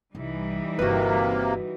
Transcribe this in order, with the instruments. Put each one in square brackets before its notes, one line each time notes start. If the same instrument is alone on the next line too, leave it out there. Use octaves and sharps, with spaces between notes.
[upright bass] C2 [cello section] E3 G3 D#4
[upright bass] G1 F4 [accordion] C3 A#3 [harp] F#4 B4